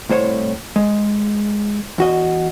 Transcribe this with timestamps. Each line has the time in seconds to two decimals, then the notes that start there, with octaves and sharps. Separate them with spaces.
0.09 C2 A2 C5 C#5
0.76 G#3
1.98 E2 F#4 D#5